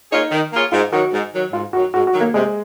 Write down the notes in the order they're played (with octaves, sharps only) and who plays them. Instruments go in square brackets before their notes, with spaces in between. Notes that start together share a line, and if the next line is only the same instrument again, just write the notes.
[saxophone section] A#3 F4 G#4 C#5 [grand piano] D#4
[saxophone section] D#3
A#3 F4 G#4 C#5
[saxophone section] G#2 [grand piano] F4
[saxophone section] D#3 F#3 [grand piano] F#4
[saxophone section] G#2
D#3 F#3
[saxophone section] G#2 [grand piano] F4
[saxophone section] D#3 F#3 [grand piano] F#4
[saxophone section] G#2 [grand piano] F#4
[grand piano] F#4
[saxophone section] D#3 F#3
[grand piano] A#3
[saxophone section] C3 [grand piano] G#3